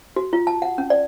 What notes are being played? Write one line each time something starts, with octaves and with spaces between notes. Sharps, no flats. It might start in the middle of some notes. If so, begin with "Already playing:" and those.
F#4
F4
A5
F#5
C#4
D5